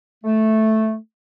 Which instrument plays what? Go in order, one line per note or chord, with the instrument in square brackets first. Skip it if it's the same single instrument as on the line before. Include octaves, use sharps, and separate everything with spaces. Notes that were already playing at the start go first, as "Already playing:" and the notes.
[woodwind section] A3